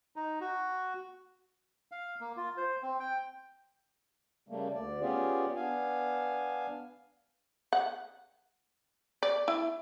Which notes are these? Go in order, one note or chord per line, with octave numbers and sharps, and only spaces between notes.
D#4
F#4
F5
A#3
F4
C5
C4
G5
C#3 G3 A3 A#3
D2 D5
B3 C#4 F4 G4 G#4 D5
B3 D4 F5 G#5
F#5
D5
E4